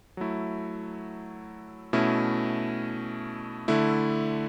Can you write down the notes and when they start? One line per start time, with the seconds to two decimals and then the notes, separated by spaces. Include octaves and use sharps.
0.17 F#3 A3 E4
1.93 B2 A3 C#4 E4
3.68 D3 A3 E4